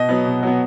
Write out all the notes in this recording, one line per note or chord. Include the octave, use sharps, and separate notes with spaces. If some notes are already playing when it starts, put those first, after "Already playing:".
Already playing: B2 D#5
F#3 B3
B2
F#3 B3